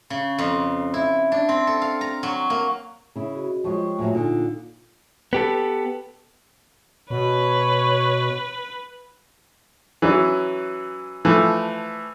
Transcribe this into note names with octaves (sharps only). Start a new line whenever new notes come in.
C#3
F2
E4
D4
C4
A4
F5
A#5
F#3
A#3
C#3 E4
F#4 G#4 D#5
F3 G3 G#3 C#5 G5 C#6
A2 F3 F#3 A#3 F4 G#5
A#2 D3 D#4 F4
B3 G4 A4
B2 B4 C#5
E3 F#3 C#4
E3 F3 A3